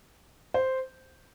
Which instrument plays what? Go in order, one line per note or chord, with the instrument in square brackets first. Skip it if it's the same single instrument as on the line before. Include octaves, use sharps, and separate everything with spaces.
[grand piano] C5